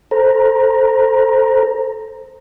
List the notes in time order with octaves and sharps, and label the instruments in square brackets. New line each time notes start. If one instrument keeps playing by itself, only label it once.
[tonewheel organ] A4 C5 A#5